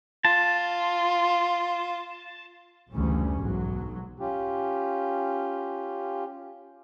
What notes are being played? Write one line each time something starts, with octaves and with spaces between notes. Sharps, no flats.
F4 A5
F#1 D2 E3 G3 C#4
B1 G#2 F#3
C#4 F4 G4